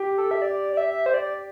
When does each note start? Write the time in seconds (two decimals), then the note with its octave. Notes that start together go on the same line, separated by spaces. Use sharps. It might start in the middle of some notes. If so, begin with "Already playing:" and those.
Already playing: G4
0.18 A4
0.31 E5
0.42 D5
0.73 D5
0.77 E5
1.06 C5
1.14 D5